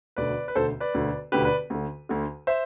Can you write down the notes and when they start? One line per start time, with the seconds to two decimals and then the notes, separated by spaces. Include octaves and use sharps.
0.16 E1 D2 D3 B4 D5
0.48 B4
0.55 E1 D2 D3 A4 C5
0.80 B4 D5
0.94 E1 D2 D3
1.32 E1 D2 D3 G4 B4
1.45 B4 D5
1.70 D2 D3
2.09 D2 D3
2.47 C5 E5